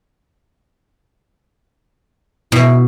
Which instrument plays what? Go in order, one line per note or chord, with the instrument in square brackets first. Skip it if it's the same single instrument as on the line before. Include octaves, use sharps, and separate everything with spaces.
[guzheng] B2 [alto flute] E4